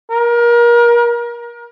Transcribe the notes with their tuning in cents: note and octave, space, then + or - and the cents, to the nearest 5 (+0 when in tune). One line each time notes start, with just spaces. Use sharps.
A#4 +30